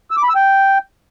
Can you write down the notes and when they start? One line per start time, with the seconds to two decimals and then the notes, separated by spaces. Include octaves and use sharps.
0.11 E6
0.17 D6
0.23 B5
0.29 E6
0.35 G5